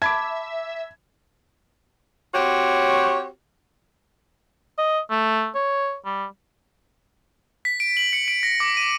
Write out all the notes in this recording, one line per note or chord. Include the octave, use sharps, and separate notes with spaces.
E5 A5 B5 D6 G#6
C4 F#4 G4 C#5
D#5
A3
C#5
G3
B6
D7
F#7
C#7
D7
A#6
D6
D#7